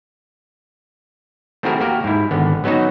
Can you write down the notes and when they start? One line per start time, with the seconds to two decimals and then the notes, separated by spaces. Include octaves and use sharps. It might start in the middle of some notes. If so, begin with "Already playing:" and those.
1.63 A3 C4 E4 F#4 G#4 A#4
1.80 A#3 F#4 G4 A#4
2.04 G#2 E4
2.31 G#1 D3 B3
2.64 F#3 B3 C#4 D#4 F#4